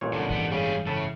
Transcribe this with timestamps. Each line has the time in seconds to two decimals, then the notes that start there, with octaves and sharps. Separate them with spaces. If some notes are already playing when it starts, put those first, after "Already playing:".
0.01 A1 A#2 C#5
0.13 C#2 B2 D3
0.30 F#1 G#2 E3 B3 G4
0.51 C#3 G3 G#4
0.87 A2 C#3 E5 A5